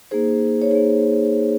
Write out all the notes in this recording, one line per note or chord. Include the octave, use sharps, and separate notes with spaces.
A#3 D#4 G#4 C5
C#5
A#3 D#4 G#4 C5